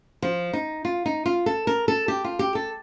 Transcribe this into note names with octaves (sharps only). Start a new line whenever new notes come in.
F3
D#4
F4
D#4
F4
A4
A#4
A4
G4
F4
G4
A4